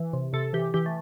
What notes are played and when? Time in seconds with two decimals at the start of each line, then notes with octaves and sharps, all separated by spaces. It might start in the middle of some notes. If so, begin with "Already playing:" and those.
Already playing: E3
0.13 C3
0.33 C3 A4
0.53 E3 G4
0.74 E3 G4
0.86 A3